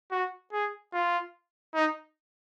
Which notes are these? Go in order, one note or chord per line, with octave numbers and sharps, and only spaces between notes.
F#4
G#4
F4
D#4